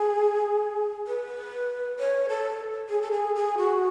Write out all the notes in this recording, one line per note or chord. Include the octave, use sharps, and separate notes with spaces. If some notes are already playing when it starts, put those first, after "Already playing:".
Already playing: G#4
B4
C#5
A4
G#4
A4
G#4
G#4
F#4